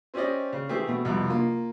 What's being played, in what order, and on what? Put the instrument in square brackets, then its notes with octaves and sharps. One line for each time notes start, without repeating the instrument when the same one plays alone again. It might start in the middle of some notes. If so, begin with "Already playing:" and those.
[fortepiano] C4 C#4 G4 D5 D#5
C#3
E3 A3 C4 G4 G#4 C5
B2 A3
C2 F2 B2
A#3 F4